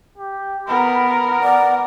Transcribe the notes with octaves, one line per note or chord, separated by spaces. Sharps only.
G4
B3 A#4 B5
D5 F#5